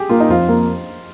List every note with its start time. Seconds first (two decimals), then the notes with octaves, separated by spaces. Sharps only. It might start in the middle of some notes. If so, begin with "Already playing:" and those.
Already playing: G4 G#4
0.09 A#3 F4
0.20 D#4
0.29 F2 F4
0.48 A#3